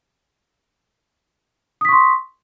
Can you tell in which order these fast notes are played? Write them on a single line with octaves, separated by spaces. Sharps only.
D#6 B6 C#6 C6